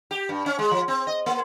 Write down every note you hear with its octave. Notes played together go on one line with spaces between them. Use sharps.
G4
G2
C#4
G#3
F3
C4
D#5
A#3